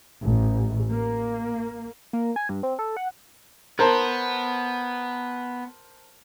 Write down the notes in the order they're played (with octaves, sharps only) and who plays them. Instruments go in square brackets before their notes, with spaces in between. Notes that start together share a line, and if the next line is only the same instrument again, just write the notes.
[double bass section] A1
A#3
[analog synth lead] A#3
G#5
G2
C4
A4
F#5
[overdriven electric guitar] B3 [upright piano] A#4 C5 A5